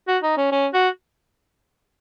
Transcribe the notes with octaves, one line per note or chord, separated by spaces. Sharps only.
F#4
D#4
C#4
C#4
F#4